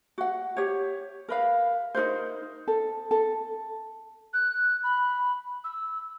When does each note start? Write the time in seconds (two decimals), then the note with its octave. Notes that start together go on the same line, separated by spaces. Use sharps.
0.18 F#4 F#5
0.57 G4 C#5
1.28 A#4 B4 F5
1.94 D#4 F4 A#4 C5
2.68 A4
3.11 A4
4.33 F#6
4.83 B5
5.64 E6